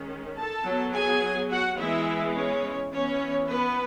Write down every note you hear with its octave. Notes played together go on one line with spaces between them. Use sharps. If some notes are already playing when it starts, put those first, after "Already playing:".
Already playing: D#3 G#3 C#4
A4 A5
F#3 B3
G#4 G#5
F#4 F#5
E3 G#3 B3 E4 E5
C#4 C#5
E3 B3 C#4 C#5
B3 B4